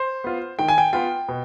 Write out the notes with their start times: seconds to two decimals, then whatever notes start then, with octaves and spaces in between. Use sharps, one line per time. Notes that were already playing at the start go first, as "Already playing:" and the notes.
Already playing: C5
0.24 B3 F4
0.59 D#3 G5
0.68 G#5
0.78 G5
0.93 B3 F4 G5
1.28 B2